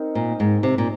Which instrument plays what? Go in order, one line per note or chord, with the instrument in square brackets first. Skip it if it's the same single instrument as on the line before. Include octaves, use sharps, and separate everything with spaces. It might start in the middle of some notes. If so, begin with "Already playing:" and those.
Already playing: [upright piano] C4 D#4 A#4
[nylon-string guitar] A#2
G#2
C3
A#2